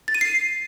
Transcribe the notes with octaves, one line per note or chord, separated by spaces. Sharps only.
A6
D#7
C7